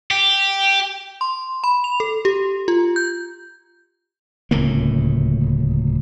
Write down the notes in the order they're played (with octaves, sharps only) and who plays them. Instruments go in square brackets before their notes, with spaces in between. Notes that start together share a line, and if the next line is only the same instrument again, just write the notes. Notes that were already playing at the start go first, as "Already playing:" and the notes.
[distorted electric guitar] G4
[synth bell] C6
B5
F7
A4
G4
F4
G6
[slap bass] D1 C#2 A2 A#3